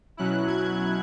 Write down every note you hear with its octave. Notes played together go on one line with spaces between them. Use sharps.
B2 F#3 C#4 E4 F#6
G#6